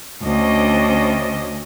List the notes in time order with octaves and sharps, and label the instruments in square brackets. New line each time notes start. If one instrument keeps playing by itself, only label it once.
[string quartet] D2 C#4 D4 C5 D#5